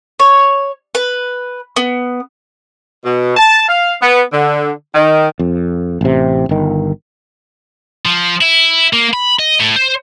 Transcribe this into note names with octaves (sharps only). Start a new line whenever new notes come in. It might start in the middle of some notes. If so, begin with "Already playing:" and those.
C#5
B4
B3
B2
A5
F5
B3
D3
D#3
F2
A1 C3
G1 D#3
F3
E4
A#3
B5
D#5
A2
C5